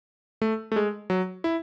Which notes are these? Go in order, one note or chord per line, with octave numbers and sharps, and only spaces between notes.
A3
A3
G#3
F#3
E4